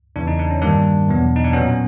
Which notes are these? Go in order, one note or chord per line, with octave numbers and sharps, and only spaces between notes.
E2 C#3 E3 D4
D#4
D4
C#4
G2 D#3 G3 A#3 D4
E2 B2 F#3 B3
D#4
D4
A#2 F#3 B3 C#4